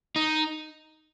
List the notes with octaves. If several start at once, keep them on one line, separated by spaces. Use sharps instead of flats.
D#4